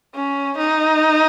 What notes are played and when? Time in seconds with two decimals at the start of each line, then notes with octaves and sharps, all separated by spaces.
0.15 C#4
0.58 D#4